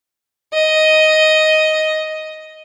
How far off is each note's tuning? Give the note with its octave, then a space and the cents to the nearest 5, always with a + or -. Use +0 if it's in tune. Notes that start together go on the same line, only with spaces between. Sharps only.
D#5 +5